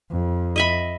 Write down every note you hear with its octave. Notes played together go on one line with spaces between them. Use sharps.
F2
D#5 E5 B5